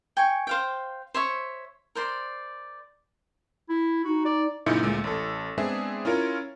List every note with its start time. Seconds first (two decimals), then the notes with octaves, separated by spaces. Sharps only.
0.17 G5 G#5 C#6
0.47 C5 F5 G5
1.14 C5 C#5 E5 C#6
1.95 A#4 C5 D5 C6
3.69 E4
4.04 D#4 F#4
4.25 D5
4.66 F#2 A#2 C#3 D#4 E4 C#7
4.83 D2 A#2 G#3
5.04 A1 A4
5.58 G#3 B3 C4 D4 G#4 E5
6.05 C#4 E4 F4 A#4 C#5